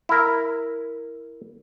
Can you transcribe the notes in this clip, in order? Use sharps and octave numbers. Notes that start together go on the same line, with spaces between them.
E4 A#4